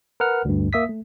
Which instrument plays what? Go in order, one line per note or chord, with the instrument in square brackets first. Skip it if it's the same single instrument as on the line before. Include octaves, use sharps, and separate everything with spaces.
[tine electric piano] A#4 B4 F#5 F6
D2 G2
A#3 E5 D#6 B6
A3